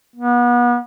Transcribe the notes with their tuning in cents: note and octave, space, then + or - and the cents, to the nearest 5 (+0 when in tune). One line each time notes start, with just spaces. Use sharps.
B3 -35